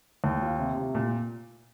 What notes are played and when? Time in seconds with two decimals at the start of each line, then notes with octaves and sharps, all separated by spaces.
0.24 D#2
0.42 F4
0.59 C3
0.77 C3
0.95 A#2